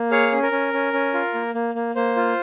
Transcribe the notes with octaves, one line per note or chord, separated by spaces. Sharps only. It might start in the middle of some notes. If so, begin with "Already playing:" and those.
Already playing: A#3
G#4 C#5 F5
C#4
A#4
C#4
C#4
C#4
F4
A#3
A#3
A#3
A#3 C5
F4